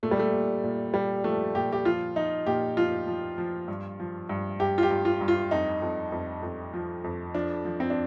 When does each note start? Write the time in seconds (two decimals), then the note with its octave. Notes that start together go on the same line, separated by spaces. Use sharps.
0.03 A#2 A3
0.11 G3
0.19 A3
0.33 A#2
0.64 A#2
0.94 A#2 G3
1.24 F3 A3
1.55 A#2 G4
1.72 G4
1.85 F3 F4
2.16 F3 D#4
2.47 A#2 G4
2.77 F3 F4
3.07 F3
3.38 F3
3.68 G2
4.00 F3
4.29 G2
4.60 G2 G4
4.78 F4
4.83 G4
4.91 G2
5.05 F4
5.21 G2
5.28 F4
5.51 F2 D#4
5.82 F2
6.12 F2
6.43 F2
6.74 F3
7.04 F2
7.35 F3 D4
7.65 F3
7.80 C4
7.90 D4